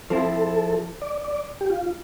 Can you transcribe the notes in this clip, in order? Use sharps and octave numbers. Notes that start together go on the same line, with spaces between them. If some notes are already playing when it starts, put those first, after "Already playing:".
F3 C4 E4 A4
D5
D5
G4
F4